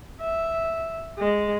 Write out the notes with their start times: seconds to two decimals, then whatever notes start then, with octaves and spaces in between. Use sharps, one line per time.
0.21 E5
1.18 G#3